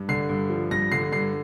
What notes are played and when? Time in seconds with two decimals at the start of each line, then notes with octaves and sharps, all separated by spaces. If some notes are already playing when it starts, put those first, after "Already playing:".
Already playing: G2
0.09 D3 C7
0.29 G2
0.50 F3
0.71 G2 A#6
0.92 D3 C7
1.12 G2 C7